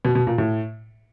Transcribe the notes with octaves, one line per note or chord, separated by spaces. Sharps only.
B2
B2
A#2
A2